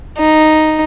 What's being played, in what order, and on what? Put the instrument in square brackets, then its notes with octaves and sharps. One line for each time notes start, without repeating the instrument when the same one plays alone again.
[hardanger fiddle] D#4